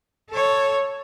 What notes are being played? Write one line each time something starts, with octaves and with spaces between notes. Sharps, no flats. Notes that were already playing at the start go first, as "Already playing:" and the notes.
A4 C#5